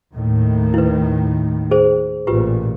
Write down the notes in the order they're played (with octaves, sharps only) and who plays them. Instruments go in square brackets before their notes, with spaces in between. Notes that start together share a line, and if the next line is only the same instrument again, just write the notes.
[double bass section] D#2 A2 D#3
[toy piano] E4 B4
G#4 C5
[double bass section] A1 A#2 [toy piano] F4 G4 B4